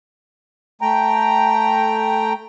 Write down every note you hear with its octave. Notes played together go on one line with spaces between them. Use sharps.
A3 G5 A#5